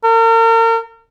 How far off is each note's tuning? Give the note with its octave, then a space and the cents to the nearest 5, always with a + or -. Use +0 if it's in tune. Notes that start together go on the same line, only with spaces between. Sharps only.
A#4 -40